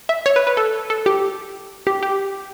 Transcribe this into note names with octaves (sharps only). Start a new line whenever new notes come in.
E5
C#5
B4
B4
A4
A4
G4
G4
G4